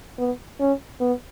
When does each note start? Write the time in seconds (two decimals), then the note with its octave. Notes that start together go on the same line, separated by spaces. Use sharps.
0.19 B3
0.60 C#4
1.00 B3